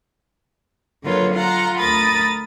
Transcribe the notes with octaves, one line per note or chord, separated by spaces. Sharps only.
D3 F#3 A#3 F4 B4 C#5
F4 F5 F#5 A#5
D2 A#4 B5 D#6 A6